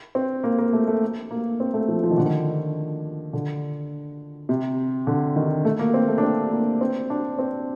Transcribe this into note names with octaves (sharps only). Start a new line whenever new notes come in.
C4
A#3
A#3
A3
A3
A#3
C4
A3
F3
F3
D#3
D3
D#3
D3
C3
D3
D#3
A3
A#3
C4
A3
D4
C4
A#3
C4
D4
C4